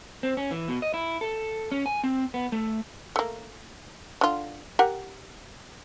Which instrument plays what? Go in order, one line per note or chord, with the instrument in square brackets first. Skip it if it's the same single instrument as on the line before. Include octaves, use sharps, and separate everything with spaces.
[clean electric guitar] C4
C#4
E3
B2
D#5
E4
A4
C#4
G#5
C4
B3
A3
[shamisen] A3 A#3
D3 F4
G4 A#4 F#5